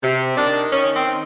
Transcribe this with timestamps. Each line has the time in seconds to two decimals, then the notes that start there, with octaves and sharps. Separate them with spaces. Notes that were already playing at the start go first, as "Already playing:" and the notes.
0.03 C3
0.37 D#3 D4
0.72 D#3 C#4
0.95 C4
1.06 D#3